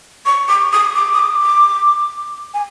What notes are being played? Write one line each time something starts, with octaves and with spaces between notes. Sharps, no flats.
C#6
D6
D#6
D6
D#6
D6
D6
G#5